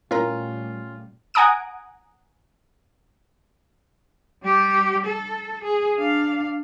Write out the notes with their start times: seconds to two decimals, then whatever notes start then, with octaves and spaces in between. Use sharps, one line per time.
0.11 A#2 G3 A3 C#4 E4 F4 A#4 A#5
1.34 F#5 G#5 A#5 D#6 D7
4.43 G3 G4
5.05 A4
5.64 G#4
5.98 D4 F5